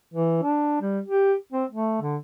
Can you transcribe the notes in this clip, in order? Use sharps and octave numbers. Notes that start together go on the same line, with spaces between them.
E3
D4
G3
G4
C4
A3
D3